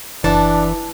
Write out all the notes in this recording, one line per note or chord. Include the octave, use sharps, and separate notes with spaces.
F#1 E3 D4 A5